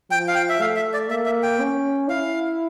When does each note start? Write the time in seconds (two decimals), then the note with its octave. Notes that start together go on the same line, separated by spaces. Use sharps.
0.10 F3 G5
0.28 F5
0.35 G5
0.49 E5
0.60 A3 F5
0.76 E5
0.94 D5
1.10 A#3 E5
1.26 E5
1.43 G5
1.59 C#4
2.09 E4 F5